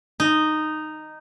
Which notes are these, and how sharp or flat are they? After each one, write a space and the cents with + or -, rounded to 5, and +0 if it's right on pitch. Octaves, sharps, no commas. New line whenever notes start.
D#4 -10